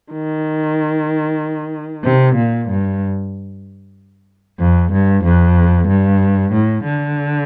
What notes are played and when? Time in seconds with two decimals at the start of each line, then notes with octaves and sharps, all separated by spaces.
0.12 D#3
2.04 C3
2.36 A#2
2.69 G2
4.60 F2
4.92 G2
5.25 F2
5.88 G2
6.53 A2
6.85 D3